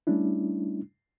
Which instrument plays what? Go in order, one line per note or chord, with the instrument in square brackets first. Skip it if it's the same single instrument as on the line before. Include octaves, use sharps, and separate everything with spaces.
[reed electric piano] G3 A3 C#4 D4 E4